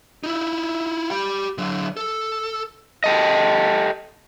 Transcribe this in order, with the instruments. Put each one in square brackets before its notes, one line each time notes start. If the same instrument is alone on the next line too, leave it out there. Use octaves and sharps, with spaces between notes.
[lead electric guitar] D#4 E4
G4 B5
D3 F#3
A4
[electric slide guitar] G4 A4 D#5